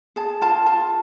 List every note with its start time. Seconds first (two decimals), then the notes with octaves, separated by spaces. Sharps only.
0.16 G#4 A5
0.42 F4 A5
0.66 F4 A5